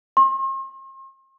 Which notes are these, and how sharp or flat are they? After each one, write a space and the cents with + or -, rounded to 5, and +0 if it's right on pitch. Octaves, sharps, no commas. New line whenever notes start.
C6 +45